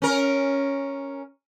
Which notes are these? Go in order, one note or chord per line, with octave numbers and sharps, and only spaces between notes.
C#4 A#4